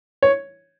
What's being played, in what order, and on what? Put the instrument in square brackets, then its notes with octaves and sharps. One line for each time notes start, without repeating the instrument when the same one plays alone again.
[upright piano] C#5